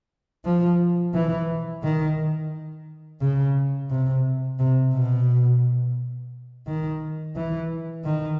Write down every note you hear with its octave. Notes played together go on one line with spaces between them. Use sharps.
F3
E3
D#3
C#3
C3
C3
B2
D#3
E3
D#3